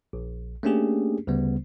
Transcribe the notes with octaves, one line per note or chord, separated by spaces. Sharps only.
A#1
A3 A#3 C#4 D4 G4 G#4
D2 C#3 G3 B3